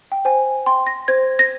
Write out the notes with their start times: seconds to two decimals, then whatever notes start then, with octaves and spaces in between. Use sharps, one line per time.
0.12 G5
0.25 C5 G#5
0.66 G5 C6
0.87 A#6
1.08 C5 G#6
1.39 A#6